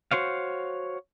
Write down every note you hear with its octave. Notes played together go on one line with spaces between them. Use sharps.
F#4 C5 C#5 F5